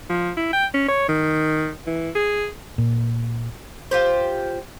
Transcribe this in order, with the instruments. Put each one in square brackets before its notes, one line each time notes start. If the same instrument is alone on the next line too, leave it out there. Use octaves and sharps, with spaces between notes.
[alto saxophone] F3
E4
G5
C#4
C#5
D#3
E3
G#4
[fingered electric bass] A#2
[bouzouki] F4 G4 C5